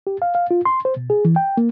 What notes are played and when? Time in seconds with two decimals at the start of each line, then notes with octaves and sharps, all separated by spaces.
0.07 G4
0.22 F5
0.35 F5
0.51 F4
0.65 C6
0.85 C5
0.97 B2
1.10 G#4
1.25 E3
1.36 G5
1.57 A#3